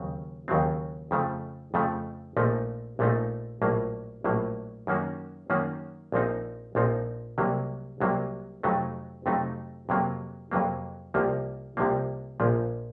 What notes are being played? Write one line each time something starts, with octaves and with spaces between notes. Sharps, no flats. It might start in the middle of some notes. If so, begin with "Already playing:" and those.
Already playing: D#2 C#3 F#3 C4
D#2 C#3 F#3 C4
F2 C#3 F3 A3
F2 C#3 F3 A3
A#1 A#2 F3 A3 D#4
A#1 A#2 F3 A3 D#4
A#1 A2 F#3 A#3
A#1 A2 F#3 A#3
F#2 D#3 A#3 C#4 F#4
F#2 D#3 A#3 C#4 F#4
A#1 A#2 F3 C4 D#4
A#1 A#2 F3 C4 D#4
C2 C3 F#3 A#3
C2 C3 F#3 A#3
F2 C3 F#3 A3 D#4
F2 C3 F#3 A3 D#4
F2 C3 F#3 A#3
F2 C3 F#3 A#3
C2 C3 F3 A#3
C2 C3 F3 A#3
A#1 A#2 F3